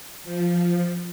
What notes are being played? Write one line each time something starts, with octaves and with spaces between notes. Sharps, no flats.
F3